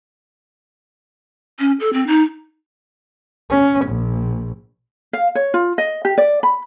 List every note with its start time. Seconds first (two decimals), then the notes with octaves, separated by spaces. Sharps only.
1.59 C#4
1.80 A4
1.93 C4
2.07 D#4
3.50 C#4
3.86 A#1
5.13 F5
5.35 C#5
5.54 F4
5.78 D#5
6.05 G4
6.18 D5
6.43 B5